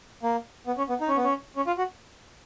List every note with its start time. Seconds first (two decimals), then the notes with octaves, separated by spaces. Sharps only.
0.23 A#3
0.67 B3
0.78 C#4
0.89 B3
1.01 D#4
1.09 C#4
1.17 B3
1.24 C#4
1.56 C#4
1.67 F4
1.78 F#4